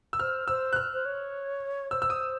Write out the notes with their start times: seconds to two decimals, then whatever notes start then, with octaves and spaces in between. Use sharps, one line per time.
0.13 E6
0.19 C5 F6
0.48 C5 E6
0.73 F#6
0.76 F6
0.94 C5
1.05 C#5
1.91 C5 E6
2.02 E6
2.10 D#6